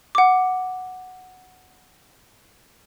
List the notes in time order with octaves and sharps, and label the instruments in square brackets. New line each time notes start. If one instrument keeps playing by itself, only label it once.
[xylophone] F#5 D6